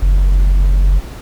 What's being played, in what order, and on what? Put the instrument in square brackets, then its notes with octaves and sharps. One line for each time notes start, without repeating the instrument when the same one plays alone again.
[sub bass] F#1